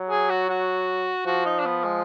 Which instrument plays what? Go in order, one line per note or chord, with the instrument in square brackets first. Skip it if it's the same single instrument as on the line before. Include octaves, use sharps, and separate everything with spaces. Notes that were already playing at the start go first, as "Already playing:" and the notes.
Already playing: [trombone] F#3
[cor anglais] G#4
F#4
F#4
[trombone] F3 [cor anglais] F#4
[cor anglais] D#4
D4
B3
G#3